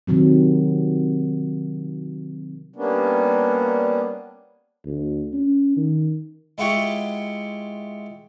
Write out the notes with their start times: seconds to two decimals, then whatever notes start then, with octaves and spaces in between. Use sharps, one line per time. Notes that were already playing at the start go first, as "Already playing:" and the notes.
0.07 C3 D#3 F#3 C4
2.76 G3 A#3 B3 C#4 D4
4.86 D2
5.33 C#4
5.76 D#3
6.58 G#3 E4 F4 G4 F#5 C#6